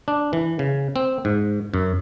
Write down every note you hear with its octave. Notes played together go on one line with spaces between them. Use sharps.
D4
E3
C#3
C4
G#2
F#2